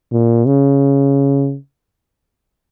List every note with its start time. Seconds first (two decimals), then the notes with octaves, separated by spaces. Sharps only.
0.12 A#2
0.46 C#3